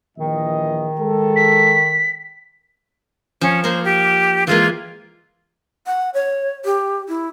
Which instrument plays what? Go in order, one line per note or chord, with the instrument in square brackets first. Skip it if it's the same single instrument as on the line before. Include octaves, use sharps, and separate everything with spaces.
[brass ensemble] A#1 E3 D#5 [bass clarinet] D#3
[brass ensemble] G#3 G#4 A4
[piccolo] B6
[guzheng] F3 [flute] C#4
[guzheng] A#3 A#4 [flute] C5
[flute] G4
[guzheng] E3 G#3 A#3 [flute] F4
[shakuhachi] F#5
C#5
G4
E4